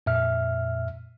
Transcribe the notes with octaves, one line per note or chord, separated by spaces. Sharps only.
F2 A#2 E5 F6